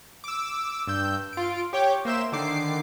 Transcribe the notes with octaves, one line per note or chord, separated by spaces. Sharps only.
D6 E6
G2 E6 G6
F4 D7
G4 C#5 G5 D6
A#3 C5 E5 E7
D3 D#3 D6 C7